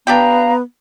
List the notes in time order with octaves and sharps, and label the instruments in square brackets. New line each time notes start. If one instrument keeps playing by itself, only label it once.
[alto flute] B3 [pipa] D4 G4 G5 [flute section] F5 A#5